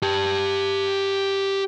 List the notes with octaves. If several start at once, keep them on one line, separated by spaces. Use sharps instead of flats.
G4 A5